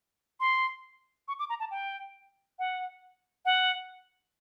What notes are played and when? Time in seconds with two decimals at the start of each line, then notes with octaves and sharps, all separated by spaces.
0.40 C6
1.28 C#6
1.39 D6
1.49 A#5
1.60 A5
1.71 G5
2.59 F#5
3.45 F#5